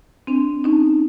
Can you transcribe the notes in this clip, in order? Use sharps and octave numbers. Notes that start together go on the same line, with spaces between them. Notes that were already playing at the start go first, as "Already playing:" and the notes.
C4 D4
C#4 D#4